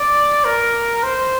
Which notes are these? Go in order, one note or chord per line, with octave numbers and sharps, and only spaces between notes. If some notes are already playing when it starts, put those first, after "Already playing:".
Already playing: D5
A#4
C5